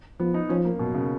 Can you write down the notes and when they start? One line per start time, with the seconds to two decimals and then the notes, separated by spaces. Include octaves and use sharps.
0.19 F3 B3
0.34 D#4
0.49 F3 C#4
0.65 A#3
0.79 F#2 B2
0.95 C#3